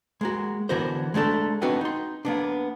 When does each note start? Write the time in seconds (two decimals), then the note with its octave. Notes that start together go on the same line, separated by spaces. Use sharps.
0.21 G#3 A#3 F#4
0.69 D3 E3 B3 F#4 A#4 C5
1.14 G#3 A3 D4 A4
1.62 B3 C4 D4 D#4 F#4 B4
1.81 D#4 C6
2.25 A#3 B3 D4